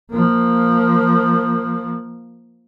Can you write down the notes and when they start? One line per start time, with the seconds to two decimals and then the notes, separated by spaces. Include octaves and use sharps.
0.11 F3 A#3